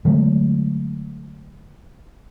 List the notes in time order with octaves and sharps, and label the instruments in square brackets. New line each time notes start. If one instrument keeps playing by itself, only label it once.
[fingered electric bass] D3 F#3 G#3 A3